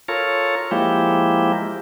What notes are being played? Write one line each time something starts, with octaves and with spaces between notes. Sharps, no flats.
F4 A4 A#4 C#5
F3 G#3 A#3 E4 G4